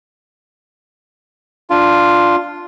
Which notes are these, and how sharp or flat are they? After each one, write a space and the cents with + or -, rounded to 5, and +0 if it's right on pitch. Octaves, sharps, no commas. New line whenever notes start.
D4 +0 F4 +0